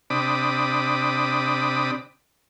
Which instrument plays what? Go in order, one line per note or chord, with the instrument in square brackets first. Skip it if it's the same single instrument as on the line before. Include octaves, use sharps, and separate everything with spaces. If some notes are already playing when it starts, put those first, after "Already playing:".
[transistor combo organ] C3 D4 B5 D6 D#6